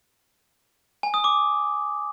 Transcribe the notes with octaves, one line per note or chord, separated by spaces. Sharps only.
G#5
D#6
D6